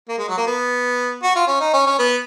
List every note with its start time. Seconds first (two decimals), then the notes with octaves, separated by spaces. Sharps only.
0.08 A#3
0.18 G#3
0.28 F#3
0.37 A#3
0.47 B3
1.23 F#4
1.36 F4
1.47 C#4
1.60 D#4
1.73 C#4
1.86 C#4
1.99 B3